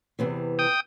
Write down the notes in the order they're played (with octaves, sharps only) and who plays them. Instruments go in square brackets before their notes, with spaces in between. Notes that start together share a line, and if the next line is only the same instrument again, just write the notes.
[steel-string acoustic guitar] E2 C3 E3
[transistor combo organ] G5 D#6